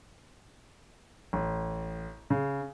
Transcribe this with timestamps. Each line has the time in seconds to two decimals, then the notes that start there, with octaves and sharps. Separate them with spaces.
1.33 A1
2.30 C#3